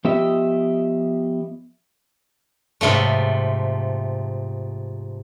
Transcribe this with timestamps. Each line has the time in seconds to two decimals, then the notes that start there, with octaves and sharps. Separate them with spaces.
0.04 F3 B3 G4 D#5 E5
2.81 G#2 C3 F3 A3